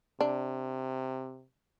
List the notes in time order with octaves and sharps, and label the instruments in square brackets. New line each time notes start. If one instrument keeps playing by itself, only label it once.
[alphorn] C3 [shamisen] D4